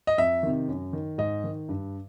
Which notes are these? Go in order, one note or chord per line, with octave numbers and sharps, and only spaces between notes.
D#5
F2 E5
C3 D#3
F#2
D#3
G#2 D#5
D#3
G2